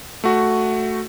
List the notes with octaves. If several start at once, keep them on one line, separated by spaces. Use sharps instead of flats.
A3 F#4